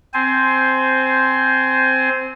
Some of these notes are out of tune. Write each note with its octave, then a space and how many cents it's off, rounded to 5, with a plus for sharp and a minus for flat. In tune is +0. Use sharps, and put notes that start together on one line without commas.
C4 +0 C5 -5 G#5 +20